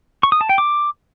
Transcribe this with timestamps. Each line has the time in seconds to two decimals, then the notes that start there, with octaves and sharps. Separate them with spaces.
0.23 C#6
0.32 D#6
0.41 A5
0.49 G5
0.58 D6